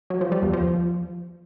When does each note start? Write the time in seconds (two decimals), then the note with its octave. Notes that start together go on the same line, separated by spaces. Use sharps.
0.10 F#3
0.21 F3
0.32 G3
0.43 E2
0.53 F3